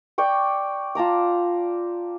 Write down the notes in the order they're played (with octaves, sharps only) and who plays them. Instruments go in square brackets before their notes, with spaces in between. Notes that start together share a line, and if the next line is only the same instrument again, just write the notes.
[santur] D5 G5 C#6
F4 A5 A#5 D6